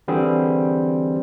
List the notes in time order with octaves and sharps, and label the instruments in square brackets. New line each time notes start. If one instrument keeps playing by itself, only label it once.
[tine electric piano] D3 E3 G3 C4 G#4